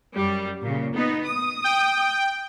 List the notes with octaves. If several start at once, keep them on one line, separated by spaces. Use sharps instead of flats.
F#2 G3
A#2 C#3
B3 D#4
D#6
G5